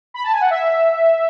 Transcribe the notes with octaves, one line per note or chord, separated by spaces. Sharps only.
B5
A5
G#5
F#5
E5